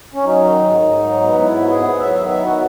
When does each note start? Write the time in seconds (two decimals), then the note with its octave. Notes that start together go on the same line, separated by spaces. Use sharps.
0.14 C#4
0.24 F#3 D#4
0.44 D#3
0.64 G#2
0.83 G#2
1.03 F#3
1.21 B3
1.41 G#2 E4
1.60 B3 F#4
1.70 G#4
1.80 B3
1.99 F#3 E5
2.14 D#3 E5
2.28 E5
2.38 B3 E4
2.43 F#4